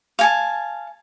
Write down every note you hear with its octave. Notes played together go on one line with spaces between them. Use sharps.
F5 G#5 A5